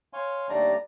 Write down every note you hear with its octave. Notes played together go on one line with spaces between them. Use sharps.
C#5 F5 G#5 C6
D#2 G3 A3 D4 D5 A#5